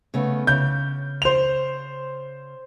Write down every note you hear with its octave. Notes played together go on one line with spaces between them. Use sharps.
C#3 A3 B3
C#3 G6
C5 F7